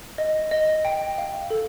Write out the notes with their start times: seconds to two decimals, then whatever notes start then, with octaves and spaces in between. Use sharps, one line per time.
0.18 D#5
0.51 D#5
0.85 G5
1.18 F5
1.50 A4